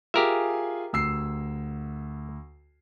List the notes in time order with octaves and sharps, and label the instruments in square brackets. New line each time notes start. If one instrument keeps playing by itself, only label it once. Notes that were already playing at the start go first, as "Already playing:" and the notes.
[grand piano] F4 G#4 G#5 [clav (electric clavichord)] G4 A#4 E5
[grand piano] D2 E6 C7